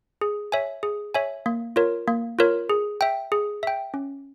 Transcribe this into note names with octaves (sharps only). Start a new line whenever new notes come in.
G#4
C#5 E5 G#5
G#4
C#5 E5 G#5
A#3
F4 A#4 C#5
A#3
F4 A#4 C#5
G#4
E5 G5
G#4
E5 G5
C#4